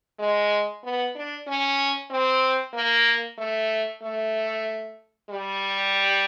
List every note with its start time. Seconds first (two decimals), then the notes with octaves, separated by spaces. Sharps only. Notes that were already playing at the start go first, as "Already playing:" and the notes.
0.19 G#3
0.83 B3
1.15 D4
1.47 C#4
2.10 C4
2.74 A#3
3.38 A3
4.02 A3
5.29 G3